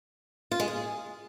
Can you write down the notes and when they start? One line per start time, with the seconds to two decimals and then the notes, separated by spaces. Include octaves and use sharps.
0.52 F4
0.60 G#3
0.68 G#4